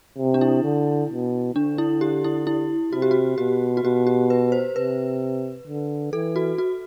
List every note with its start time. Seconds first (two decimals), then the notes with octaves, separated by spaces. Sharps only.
0.18 C3
0.34 D4
0.41 E4
0.63 D3
1.09 B2
1.55 D3 D4
1.78 E4
2.01 G4
2.24 E4
2.47 E4
2.93 C3 F#4
3.02 G4
3.11 F#4
3.38 B2 G4
3.77 F#4
3.84 B2 G4
4.07 G4
4.30 B4
4.52 C5
4.76 C3 B4
5.67 D3
6.13 E3 A4
6.36 F#4
6.58 F#4